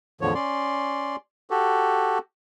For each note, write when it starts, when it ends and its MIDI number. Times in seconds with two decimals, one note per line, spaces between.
0.21 0.34 40
0.21 0.34 45
0.21 0.34 50
0.21 0.34 53
0.21 0.34 73
0.35 1.16 61
0.35 1.16 74
0.35 1.16 84
1.50 2.18 66
1.50 2.18 67
1.50 2.18 69